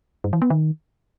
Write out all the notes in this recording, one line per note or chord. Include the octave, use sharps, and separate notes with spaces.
G2
E3
B3
D#3